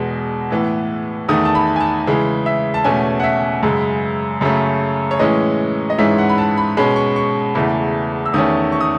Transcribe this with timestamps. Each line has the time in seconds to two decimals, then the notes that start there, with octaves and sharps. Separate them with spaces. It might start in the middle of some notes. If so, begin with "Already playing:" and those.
Already playing: E2 B2 G#3
0.50 A2 E3 B3
1.29 E2 D#3 A3 D#6
1.45 A5
1.55 B5
1.76 G#5
1.80 A5
2.07 C#3 E3 G#3
2.46 E5
2.74 A5
2.84 E2 B2 A3 C#4 G#5
3.20 F#5
3.24 E5
3.63 F#2 C#3 G#3
4.41 F#2 C#3 F#3 A3 C#4
5.11 C#5
5.19 A2 E3 G#3 C#4 D#5
5.90 D#5
5.98 G#2 E3 G#3 C#4 E5
6.18 F#5
6.29 B5
6.38 A5
6.57 B5
6.77 B2 G#3 C#4 B5
6.96 C#6
7.16 C#6
7.55 E2 C#3 E3 A3
8.26 E6
8.34 E2 D#3 A3 C#4 D#6
8.72 C#6
8.81 D#6